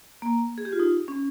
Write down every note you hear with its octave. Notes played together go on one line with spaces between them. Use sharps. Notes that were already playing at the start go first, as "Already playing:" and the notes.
A#3
G#4
G4
F4
D#4
C#4